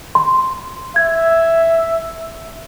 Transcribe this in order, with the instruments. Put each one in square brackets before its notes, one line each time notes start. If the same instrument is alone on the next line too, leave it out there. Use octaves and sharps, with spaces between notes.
[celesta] C6
[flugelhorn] E5 [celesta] G#6